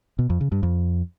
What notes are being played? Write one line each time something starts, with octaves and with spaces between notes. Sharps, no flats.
B2
F2
C#3
G2
F2